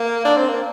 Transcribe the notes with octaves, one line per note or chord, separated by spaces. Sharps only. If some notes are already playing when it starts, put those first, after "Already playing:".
Already playing: A#3
D4
C4
A#3